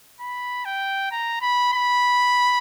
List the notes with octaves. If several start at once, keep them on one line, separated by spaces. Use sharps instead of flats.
B5
G5
A#5
B5
B5